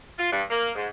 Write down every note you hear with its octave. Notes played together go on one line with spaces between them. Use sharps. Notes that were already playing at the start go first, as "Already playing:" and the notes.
F4
G2
A#3
G#2